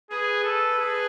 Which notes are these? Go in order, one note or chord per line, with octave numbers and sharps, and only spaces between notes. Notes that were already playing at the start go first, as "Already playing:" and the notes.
G#4 B4
A4
G#4